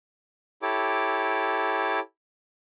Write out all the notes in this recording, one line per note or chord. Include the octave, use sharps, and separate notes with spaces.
E4 G4 A4 C#5 D6